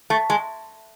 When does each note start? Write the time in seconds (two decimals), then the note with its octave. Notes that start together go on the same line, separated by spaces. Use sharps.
0.10 A3
0.30 G#3